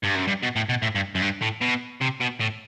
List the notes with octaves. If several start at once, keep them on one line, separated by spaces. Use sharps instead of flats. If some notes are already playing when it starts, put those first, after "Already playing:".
G2
F#2
G2
B2
A2
B2
A2
G2
F#2
G2
A2
B2
C3
B2
A2